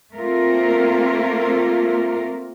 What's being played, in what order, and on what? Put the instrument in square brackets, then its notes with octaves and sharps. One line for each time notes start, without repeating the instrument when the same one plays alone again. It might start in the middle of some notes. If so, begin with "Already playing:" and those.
[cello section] A3 A#3 C4 F4 A#4